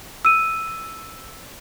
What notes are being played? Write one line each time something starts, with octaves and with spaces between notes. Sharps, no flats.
E6 D#7